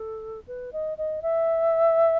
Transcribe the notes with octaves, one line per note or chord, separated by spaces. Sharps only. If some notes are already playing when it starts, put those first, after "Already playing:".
Already playing: A4
B4
D#5
D#5
E5